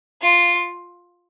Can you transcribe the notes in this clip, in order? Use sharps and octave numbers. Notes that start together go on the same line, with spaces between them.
F4